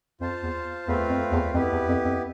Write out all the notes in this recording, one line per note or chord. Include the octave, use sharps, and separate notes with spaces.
F2 F4 C5 F5 A5
E2
E2 A3 C4 F4 B4 F5
F2
E2
F2 B3 E4 G4 B4
E2
F2
F2